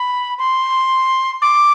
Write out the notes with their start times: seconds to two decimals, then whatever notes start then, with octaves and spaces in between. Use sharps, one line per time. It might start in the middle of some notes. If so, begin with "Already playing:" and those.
Already playing: B5
0.39 C6
1.42 D6